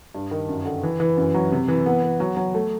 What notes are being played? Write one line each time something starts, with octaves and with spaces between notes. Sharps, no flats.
G2
D#3
F#2
D3
E3
E3
F#2
F#3
C3
E3
B3
B3
F#3
F#3
A3